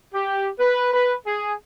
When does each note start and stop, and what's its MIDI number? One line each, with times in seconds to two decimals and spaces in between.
0.14 0.50 67
0.60 0.93 71
0.94 1.13 71
1.26 1.53 68